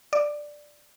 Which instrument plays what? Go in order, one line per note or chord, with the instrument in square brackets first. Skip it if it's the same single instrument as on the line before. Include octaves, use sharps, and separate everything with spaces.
[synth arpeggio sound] D5